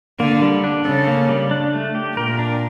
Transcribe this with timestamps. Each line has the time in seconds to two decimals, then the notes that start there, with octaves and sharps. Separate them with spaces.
0.20 D3 A#3
0.42 G3
0.64 D4
0.85 C#3 A4
1.07 A#3
1.29 G3
1.51 D4
1.73 A3
1.95 G4
2.16 A#2 A#4
2.39 D4